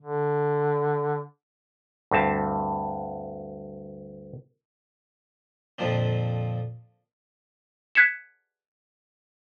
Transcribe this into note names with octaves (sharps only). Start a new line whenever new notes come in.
D3
D2 G2 C4 A5
F2 A#2 D3 F3 A#3 C4
F#6 G#6 B6 C#7 E7